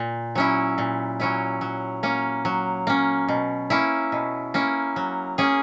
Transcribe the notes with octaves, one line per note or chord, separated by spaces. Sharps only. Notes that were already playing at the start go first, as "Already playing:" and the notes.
Already playing: A#2
F#3 C#4 E4
A#2
F#3 C#4 E4
F#3
A#3 C#4
F#3
A#3 C#4
B2
A#3 C#4 E4
B2
A#3 C#4 E4
F#3
A#3 C#4 G#4